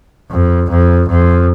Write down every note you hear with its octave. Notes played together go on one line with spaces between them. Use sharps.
F2
F2
F2